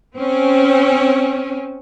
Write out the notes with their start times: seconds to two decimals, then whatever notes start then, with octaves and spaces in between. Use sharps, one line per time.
0.16 C4 C#4